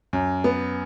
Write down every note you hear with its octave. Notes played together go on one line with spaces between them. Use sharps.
F#2
B3